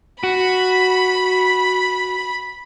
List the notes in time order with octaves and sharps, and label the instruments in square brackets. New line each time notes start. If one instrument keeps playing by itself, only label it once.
[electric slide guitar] F#4 [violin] B5